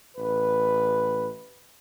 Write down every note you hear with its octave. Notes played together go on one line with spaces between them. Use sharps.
A1 B4